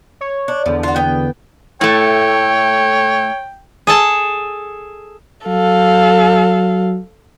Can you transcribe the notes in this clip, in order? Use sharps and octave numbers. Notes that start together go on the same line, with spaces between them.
C#5
D4
E2 D3 F3
F4 F#4
B3 G5
A2 A3 C#5 G5
G#4 A4 A5
F#3 A4 F5